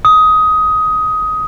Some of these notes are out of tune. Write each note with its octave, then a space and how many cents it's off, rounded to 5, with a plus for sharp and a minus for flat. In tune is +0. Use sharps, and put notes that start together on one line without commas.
D#6 +15